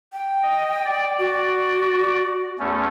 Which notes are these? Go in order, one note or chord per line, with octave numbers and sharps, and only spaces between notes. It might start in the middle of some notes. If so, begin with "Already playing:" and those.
G5
D#5
D5
F#4
E2 A3 C#4